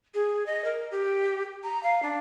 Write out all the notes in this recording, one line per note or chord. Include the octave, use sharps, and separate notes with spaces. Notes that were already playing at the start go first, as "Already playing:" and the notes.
G#4
D#5
A#4
G4
A#5
F5
D4